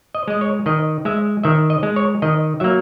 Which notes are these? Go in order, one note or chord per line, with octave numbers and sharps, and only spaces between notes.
D#5
G#3 D#5
C#5
D#3 D#5
G#3 E5
D#3 E5
D#5
G#3
C#5
D#3 D#5
F#3 A#3 E5